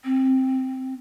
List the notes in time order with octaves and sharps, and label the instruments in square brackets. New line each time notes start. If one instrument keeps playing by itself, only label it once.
[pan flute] C4